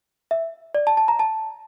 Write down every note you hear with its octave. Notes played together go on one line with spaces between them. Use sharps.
E5
D5
A5
A5
A#5
A5